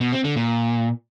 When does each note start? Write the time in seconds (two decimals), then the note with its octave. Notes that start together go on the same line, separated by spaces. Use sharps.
0.01 B2
0.13 C4
0.24 D3
0.36 A#2